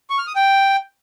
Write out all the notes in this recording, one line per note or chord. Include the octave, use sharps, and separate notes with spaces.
C#6
F6
D#6
G5